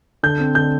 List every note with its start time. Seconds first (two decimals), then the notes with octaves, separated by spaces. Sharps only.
0.23 D3 G6
0.40 C4
0.55 D3 G6